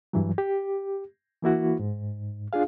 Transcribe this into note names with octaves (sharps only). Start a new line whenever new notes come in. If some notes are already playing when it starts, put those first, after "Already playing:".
G2 E3 F#3
G4
E3 A#3 E4 F#4
G#2
D4 F4 G#4 F5